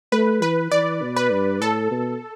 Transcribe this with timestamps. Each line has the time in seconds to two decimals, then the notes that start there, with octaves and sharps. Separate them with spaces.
0.12 A3 B4
0.42 E3 B4
0.72 E3 D5
1.02 B2
1.17 B4
1.32 G2
1.60 A2 A4
1.91 B2